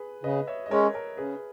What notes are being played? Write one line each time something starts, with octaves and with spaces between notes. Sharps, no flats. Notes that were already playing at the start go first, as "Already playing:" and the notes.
Already playing: G#4 B4
C#3 B4 D#5
C#5 E5
D#5
G#3 C#4 A#4 C#5
A#4 C#5
C#3 G#4 B4